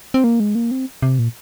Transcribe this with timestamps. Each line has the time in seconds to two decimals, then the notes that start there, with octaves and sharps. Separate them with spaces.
0.14 C4
0.24 A#3
0.40 G#3
0.55 A#3
0.71 C4
1.02 C3
1.19 A#2